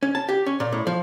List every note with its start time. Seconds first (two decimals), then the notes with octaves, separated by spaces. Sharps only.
0.03 C#4
0.15 A5
0.29 G4
0.46 C#4
0.60 A#2
0.72 A2
0.87 F3